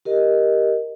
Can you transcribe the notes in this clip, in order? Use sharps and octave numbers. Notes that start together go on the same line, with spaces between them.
G4 A#4 D#5